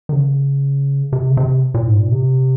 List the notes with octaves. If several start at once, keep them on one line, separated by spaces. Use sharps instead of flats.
D#3
C#3
C3
C#3
C3
A#2
G#2
A#2
C3